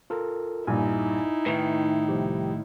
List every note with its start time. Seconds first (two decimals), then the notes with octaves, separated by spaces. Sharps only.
0.10 F4 A4 A#4
0.67 A#1 G2 D#4 E4 G#5
1.46 A2 D#3 B4
2.09 C2 F3 G4